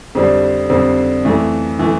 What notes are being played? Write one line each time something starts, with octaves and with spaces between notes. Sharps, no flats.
F2 D3 G3 C4
F2 D3 G3 C4
F2 E3 A3
E3 A3